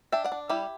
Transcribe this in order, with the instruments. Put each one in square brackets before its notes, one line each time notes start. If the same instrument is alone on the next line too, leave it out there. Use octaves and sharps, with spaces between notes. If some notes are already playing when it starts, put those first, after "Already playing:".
[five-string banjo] D4 E5 G5
D5 F#5
D4
G3 E4 G4